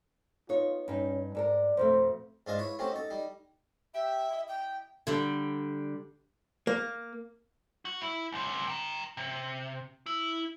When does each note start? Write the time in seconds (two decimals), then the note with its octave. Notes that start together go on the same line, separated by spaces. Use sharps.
0.49 B3 D#4 F4 C#5
0.88 G2 C#4 D#4
1.35 G#2 A4 A#4 D5
1.77 F2 B2 A3 C5
2.47 G#2 D4 F4 D#5 A5
2.58 E4 B4 C#5
2.79 A3 C4 C#4 F#4 G4
2.91 D#4 A4
3.11 G3 D#4
3.94 G4 E5
4.30 E4 D#5
4.48 G5
5.07 D3 G3
6.67 A#3
7.85 F#4
8.01 E4
8.32 C#2 C3
8.67 G5 A#5
9.17 C3
10.06 E4